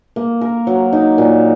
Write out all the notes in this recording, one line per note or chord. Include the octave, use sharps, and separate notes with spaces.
A#3
A#4
F#3
D#4
A#2